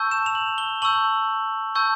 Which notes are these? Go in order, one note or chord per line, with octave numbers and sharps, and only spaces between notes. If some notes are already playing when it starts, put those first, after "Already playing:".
Already playing: A5 C#6 E6 G6
E7
F7
F#7
G7
A5 C#6 E6 G6 F#7
A5 C#6 E6 G6